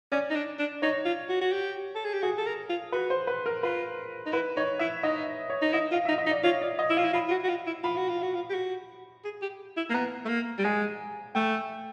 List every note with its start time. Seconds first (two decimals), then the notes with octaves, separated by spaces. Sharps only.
0.12 C#4 D5
0.30 D#4
0.36 D4
0.59 D4
0.82 D#4 C#5
1.05 F4
1.29 F#4
1.41 F#4
1.52 G4
1.95 A4
2.05 G#4
2.13 G4
2.23 F#4 G#4
2.38 A4
2.46 A#4
2.69 F4
2.92 F#4 B4
3.10 C5
3.27 B4
3.46 A#4
3.63 F4 B4
4.26 D#4
4.33 E4 B4
4.56 D#4 C#5
4.79 E4 E5
5.03 D#4 D#5
5.50 C#5
5.62 D#4
5.73 E4 D#5
5.92 F4 F5
6.05 D#4 E5
6.18 D#5
6.26 D#4
6.31 D5
6.43 F4 C#5
6.62 D5
6.79 D#5
6.90 E4
6.97 F4 F5
7.04 E4
7.13 F4 B5
7.28 F4
7.31 F#4
7.44 F#4
7.49 F4
7.66 E4
7.83 F4 B5
7.97 F#4
8.09 F4
8.23 F#4
8.35 F4
8.50 G4
8.54 F#4
9.25 G#4
9.42 G4
9.77 E4
9.90 A#3
9.94 B3 A#5
10.25 A3
10.29 A#3
10.58 G3
10.65 G#3 G#5
11.35 A3 G5